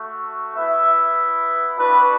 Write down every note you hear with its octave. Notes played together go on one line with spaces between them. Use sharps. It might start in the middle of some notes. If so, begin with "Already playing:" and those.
Already playing: A3 F#4
B3 E4 E5
B3 D4 F#4 B4